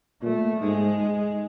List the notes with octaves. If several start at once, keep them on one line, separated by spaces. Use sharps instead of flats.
A#2 A3
G#2 G#3